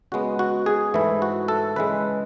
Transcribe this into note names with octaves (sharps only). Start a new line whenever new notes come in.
C#3 G#3 B3 F#4
F#4
G#4
G#2 E3 A3 E4
F#4
A4
C#3 E3 G#3 B4